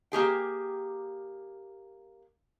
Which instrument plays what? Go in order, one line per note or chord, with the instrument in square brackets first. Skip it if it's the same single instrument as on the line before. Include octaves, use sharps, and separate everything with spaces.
[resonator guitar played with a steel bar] A#3 G4 G#4 G5